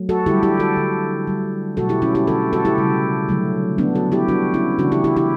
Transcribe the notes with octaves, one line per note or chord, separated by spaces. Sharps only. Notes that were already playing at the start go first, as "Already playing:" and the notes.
Already playing: F#3 A3
F#4 A4
D3 G3 E4 G4
E4 G4
F#4 A4
D3 G3
D3 G3
B2 F#3 A3 F#4 A4
E4 G4
C#4 E4
E4 G4
D3 A3 F#4 A4
F#4 A4
E4 G4
C#3 G3
D3 F#3 A3
D3 F#3 A3 B3 D4
F#4 A4
E4 G4
D3 G3 D4 F#4
C#4 E4
C#3 E3 A3 D4 F#4
E4 G4
E4 G4
E4 G4